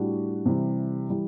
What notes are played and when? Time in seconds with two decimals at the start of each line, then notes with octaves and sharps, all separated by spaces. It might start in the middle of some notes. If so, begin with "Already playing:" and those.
Already playing: A2 G3 D4 F#4
0.46 C3 E3 G3
1.09 E3 G3